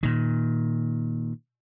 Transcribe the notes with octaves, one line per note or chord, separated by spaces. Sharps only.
A#2 D#3